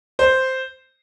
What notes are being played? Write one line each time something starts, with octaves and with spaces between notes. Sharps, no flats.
C5